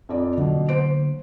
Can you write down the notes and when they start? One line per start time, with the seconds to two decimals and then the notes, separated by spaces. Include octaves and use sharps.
0.09 F2 D5
0.37 B2 D3 F#3 A#3
0.69 C5 D7